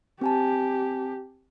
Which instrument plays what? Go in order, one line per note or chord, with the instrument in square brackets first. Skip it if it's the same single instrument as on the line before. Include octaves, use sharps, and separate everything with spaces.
[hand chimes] C4 G#5 A5 [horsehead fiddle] G4